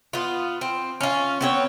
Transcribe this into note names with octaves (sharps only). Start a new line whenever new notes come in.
B3 F4
C4
C#4 F4
B3 C4 C#5